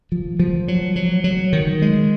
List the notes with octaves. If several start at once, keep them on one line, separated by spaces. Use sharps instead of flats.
F3
F3
F#3
F#3
F#3
D#3
G#3